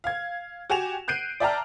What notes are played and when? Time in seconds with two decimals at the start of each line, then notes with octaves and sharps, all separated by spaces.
0.04 F5 G#6
0.70 F#4 G4 G#5 E7 F7
1.08 F#6 G6 C7 D7 D#7
1.40 D5 E5 G5 A5 A#5 F6